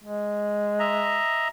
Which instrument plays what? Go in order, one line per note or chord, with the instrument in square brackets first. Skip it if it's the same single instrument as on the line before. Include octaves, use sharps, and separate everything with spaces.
[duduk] G#3
[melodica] D#5 E5 A#5